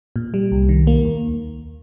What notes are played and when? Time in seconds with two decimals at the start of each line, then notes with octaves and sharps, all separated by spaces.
0.16 A#2
0.34 G3
0.52 C2
0.69 D#3
0.87 A#3
1.05 D#2